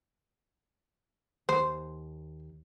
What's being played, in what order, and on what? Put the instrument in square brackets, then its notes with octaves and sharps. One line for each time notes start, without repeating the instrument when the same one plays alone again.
[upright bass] D#2 [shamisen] C5